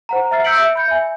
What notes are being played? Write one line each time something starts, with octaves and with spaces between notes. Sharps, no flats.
C5 F#5 A#5
E5 A#5 F6 A6 C7
E6 G6 B6 C#7 D7 F#7
E5
B5 G6 C#7
E5 G#5